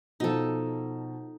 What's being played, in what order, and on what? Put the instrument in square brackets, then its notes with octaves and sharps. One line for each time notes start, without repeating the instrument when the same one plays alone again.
[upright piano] B2 F3 [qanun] D#4 A4